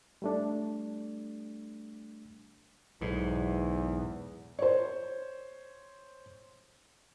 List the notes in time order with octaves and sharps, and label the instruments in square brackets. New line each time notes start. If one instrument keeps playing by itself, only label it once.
[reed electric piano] G3 A3 D4
[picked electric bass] B1 [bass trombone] E2 [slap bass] G#2
[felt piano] C5 C#5